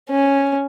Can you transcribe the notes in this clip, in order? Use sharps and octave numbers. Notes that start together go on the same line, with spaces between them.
C#4